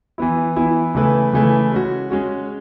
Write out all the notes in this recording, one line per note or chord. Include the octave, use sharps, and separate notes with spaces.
E3 B3 E4
E3 B3 E4
C#3 E3 A3 E4 B4
C#3 E3 A3 E4 B4
G#3 C#4 F#4
G#3 C#4 F#4